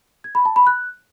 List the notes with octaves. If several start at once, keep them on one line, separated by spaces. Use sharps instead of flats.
G#6
B5
A5
B5
F#6